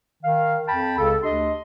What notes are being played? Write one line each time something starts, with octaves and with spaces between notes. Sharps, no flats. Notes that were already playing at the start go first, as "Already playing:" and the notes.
D#3 F5
F2 G5 A5 B5
C#2 C#3 A4
D2 D4 G4 D#5 C6